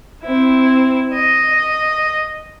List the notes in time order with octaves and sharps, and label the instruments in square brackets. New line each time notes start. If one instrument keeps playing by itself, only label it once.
[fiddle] C4 E4
D#5